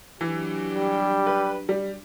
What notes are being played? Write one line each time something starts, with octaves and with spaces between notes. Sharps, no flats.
E3 F#3 D4 G4
G3
B4
G3